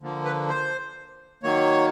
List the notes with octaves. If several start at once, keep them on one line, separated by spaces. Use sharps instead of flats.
D3 F3 A#3
B4
C5
D#3 F#3 A#3 C#5